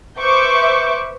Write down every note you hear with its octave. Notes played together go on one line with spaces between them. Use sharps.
B4 C5 E5 C#6 D6 G6